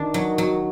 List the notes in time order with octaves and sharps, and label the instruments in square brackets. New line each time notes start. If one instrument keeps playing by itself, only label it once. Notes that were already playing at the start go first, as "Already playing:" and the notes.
Already playing: [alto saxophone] D#3 [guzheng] D4
[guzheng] F#3
F#3